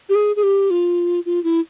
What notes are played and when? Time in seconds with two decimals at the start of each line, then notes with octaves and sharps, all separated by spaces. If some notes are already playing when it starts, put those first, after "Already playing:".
0.09 G4
0.15 G#4
0.36 G#4
0.43 G4
0.71 F4
1.26 F4
1.44 E4